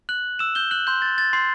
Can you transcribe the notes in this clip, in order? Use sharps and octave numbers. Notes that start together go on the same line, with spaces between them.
F#6 F#7
E6 E7
G6 G7
F#6 F#7
C6 G6
A6
A6
C6 C7